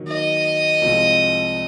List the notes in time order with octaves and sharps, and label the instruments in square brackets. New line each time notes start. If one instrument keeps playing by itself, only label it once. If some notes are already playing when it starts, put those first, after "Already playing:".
Already playing: [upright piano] D#3 F#3 A#3
[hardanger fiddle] D#5
[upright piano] C2 C3 F3 G#3 C4